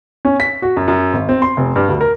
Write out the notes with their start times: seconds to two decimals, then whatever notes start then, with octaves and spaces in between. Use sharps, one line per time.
0.25 C#4
0.40 B6
0.62 F#4
0.77 F#2
0.88 F#2
1.13 G#1
1.29 C4
1.42 C6
1.57 F1
1.76 G2
1.89 D2
2.01 A#4